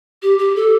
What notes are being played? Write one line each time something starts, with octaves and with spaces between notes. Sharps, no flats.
G4
G4
A4